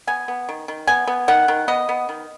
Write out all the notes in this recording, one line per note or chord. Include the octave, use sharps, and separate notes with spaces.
B3 G#5
B3
D#3
D#3
B3 G#5
B3
D#3 F#5
D#3
B3 D#5
B3
D#3